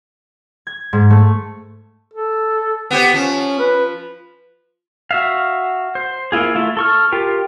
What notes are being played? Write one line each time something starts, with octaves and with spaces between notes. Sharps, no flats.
G#6
G#2
A3
A4
B3 G4 C5
F3 C#4
B4
F#4 E5 F5
C5
A#3 E4 F4 G#4
A3 E4 F4
A4 C#6 F6
F4 G4 A#4